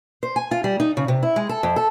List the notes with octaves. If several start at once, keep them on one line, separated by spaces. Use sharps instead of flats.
C5
G#5
F4
G3
D#4
C#3
C3
E4
G#3
A4
F2
A4